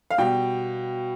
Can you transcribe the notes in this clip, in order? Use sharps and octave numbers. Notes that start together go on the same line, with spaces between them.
F5
B2 G3 G5